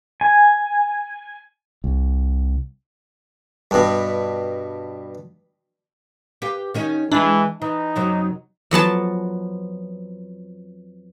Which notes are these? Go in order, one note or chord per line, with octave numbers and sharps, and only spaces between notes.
G#5
C2
G2 B2
G4 B4 F5
D#3 C#4 D#4
E3 G#3 D4 E4
E3 D#4
F#2 C3 F#3
F2 F#3 B3 A5